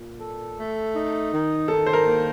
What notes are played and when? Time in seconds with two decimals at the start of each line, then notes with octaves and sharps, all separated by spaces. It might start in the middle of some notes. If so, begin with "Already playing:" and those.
Already playing: A#2
0.20 A4
0.57 A3
0.94 D#4
1.32 D#3
1.68 D#3 A4
1.86 C5
1.93 A#4
2.06 A#3